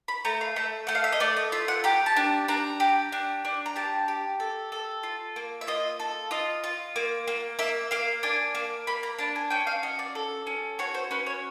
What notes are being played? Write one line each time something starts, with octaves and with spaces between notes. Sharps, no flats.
B5
A3 A#5
F5
A3 E5
A3 F#5
F5
E5
D#5
A3 D5
D#5
F4 E5
F#5
G4 A#5
A5
D4
D4 A#5
G4
D4
D4
A#5
G4 A5
G4
A4
A4
F4
A#3
E5
F4 D#5
A4
F4 D#5
F4
A#3
A#3
A#3 E5
A#3 F5
D4 G#5
A#3
A#3 B5
A#5
D4 A5
G#5
C#4 G5
F5
F#4 D#5
D5
A4
C#4
F#4 C#5
C5
C#4 B4
C#5